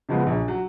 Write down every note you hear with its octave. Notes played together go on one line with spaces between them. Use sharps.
C#3 F3 G#3 B3
A#1
F#3